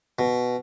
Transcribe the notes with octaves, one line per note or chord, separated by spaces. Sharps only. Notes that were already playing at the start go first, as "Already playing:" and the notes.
B2